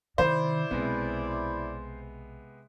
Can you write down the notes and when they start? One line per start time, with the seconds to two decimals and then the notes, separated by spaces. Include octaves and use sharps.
0.18 C3 D#3 E4 C5 D5
0.71 B1 C3 G#3 B3